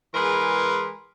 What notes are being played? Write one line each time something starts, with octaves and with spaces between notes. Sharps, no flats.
E3 G#3 G#4 A#4 B4 C6